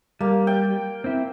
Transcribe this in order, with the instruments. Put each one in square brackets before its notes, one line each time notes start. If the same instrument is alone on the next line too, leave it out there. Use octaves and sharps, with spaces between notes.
[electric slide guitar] G3 [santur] A#3
[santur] G5
[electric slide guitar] C4 E4